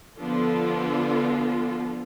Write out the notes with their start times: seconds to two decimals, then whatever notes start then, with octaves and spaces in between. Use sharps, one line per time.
0.17 D3 F3 B3 D4 F4 A4